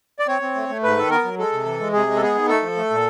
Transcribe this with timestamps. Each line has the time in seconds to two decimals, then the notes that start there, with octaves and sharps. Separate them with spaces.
0.19 D5
0.28 C4 C#5
0.42 C4
0.55 A3
0.69 A3
0.83 G#2 B4
0.97 D#3 A4
1.10 B3 A#4
1.24 F#3
1.38 G#3 A4
1.53 C3
1.65 E3
1.80 G#3
1.93 C3 G#4
2.07 G#3
2.17 A4
2.21 B3 G#4
2.35 D#3
2.48 A3 A4
2.62 F3
2.77 A3
2.90 A#2